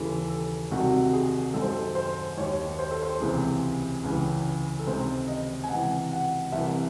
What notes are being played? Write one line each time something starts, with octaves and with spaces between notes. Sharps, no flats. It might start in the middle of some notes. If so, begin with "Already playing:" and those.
Already playing: D#2 C#3 E3 A4
A4
C2 C3 D#3 F#4
G#4
F#2 D#3 A4
C5
A4
C5
D#2 D#3 C#5
C5
A4
C5
C#2 C3 E3 G#4
C#2 C#3 E3
A4
C#2 C3 D#3 C5
D#5
G#5
C#2 C3 E3 F#5
F#5
C2 C3 E3 E5